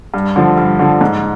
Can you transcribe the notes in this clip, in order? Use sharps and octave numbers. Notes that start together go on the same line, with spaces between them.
G2
D3 F3
G2
D3 F3
G#2